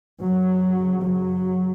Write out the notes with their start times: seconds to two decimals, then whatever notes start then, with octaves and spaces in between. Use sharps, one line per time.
0.21 F#2 C#3 F#3
1.02 F#3